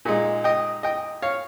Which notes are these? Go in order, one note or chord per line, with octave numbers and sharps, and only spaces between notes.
A#2 G#3 D#4
D#5 G5
D#5 G5
C#5 F5